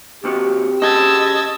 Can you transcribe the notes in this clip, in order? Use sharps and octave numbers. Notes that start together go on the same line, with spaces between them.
D#2 C4 F#4 G4
C#4 G#4 D#5 A5 E6 G#6 A6